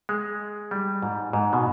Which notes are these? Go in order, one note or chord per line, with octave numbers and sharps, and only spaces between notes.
G#3
G3
G#2
G#2
B2